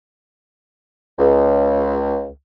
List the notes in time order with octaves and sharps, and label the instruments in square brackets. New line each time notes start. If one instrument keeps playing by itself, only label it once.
[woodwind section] C#2